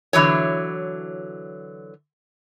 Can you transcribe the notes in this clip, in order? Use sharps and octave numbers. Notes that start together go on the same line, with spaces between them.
D3 E3 F#3 C#5